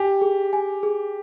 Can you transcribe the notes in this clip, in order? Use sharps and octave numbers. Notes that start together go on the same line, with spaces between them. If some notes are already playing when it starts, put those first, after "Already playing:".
Already playing: G4 G#5
G#4
G#5
G#4